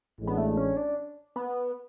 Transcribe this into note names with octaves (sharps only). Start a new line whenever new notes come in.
A1 A2 G#3 D4
B3
A3
C#4
D4
B3